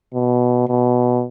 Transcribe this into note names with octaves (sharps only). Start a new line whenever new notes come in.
B2
B2